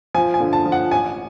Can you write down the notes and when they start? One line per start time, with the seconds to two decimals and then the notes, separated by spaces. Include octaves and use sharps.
0.14 F3 G#5
0.34 G#5
0.40 D3
0.53 A5
0.66 F3
0.72 F#5
0.91 A1 G#5